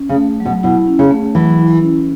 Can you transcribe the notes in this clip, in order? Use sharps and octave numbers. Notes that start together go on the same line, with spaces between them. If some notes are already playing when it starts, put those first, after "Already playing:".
Already playing: C#4
C#3
A3
F#3
B2
B2 E4
C#4
C#3
A3
E3 F#3
E4
C#4